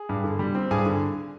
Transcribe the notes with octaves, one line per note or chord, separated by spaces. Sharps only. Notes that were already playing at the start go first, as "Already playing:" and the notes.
Already playing: G#4
G2
D3
G3
C4
G2 G#4 G#5
D3